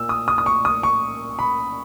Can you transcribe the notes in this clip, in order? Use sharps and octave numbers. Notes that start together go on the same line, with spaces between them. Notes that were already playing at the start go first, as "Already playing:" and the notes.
Already playing: A#2 E6
D#6
D#6
D#6
C#6
D#6
C#6
B5